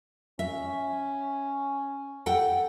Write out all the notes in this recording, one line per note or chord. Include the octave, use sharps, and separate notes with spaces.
C#4 E5
A4 F#5 G5